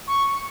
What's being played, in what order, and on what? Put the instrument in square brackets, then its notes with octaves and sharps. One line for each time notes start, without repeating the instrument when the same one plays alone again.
[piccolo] C#6